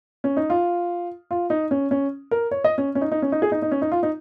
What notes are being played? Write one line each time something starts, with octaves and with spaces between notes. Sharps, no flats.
C#4
D#4
F4
F4
D#4
C#4
C#4
A#4
C#5
D#5
C#4
C#4
D#4
D#4
C#4
D#4
G#4
D#4
D#4
C#4
D#4
F4
D#4